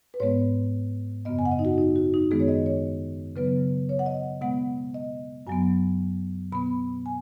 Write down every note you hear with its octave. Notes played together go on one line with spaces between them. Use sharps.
B4
G#2 G#3 B3 C#5
F#2 C#3 B3 D#5
G#5
F#5
D#5
D#4
F#4
D#4
F#4
D#4
F#2 D#3 G#3 B3 G#4
C#5
D#5
C#5
C#3 F#3 B3 B4
C#5
F#5
D#5
B2 G#3 B3 F#5
D#5
F#2 F#3 B3 G#5
B2 B3 B5
G#5